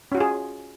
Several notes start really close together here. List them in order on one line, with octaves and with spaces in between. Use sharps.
C#4 F#4 F4 G#4